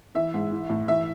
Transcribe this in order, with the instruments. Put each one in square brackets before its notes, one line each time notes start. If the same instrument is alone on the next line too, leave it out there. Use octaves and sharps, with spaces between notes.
[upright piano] E3 E5
G#2
E3
A2
E3 E5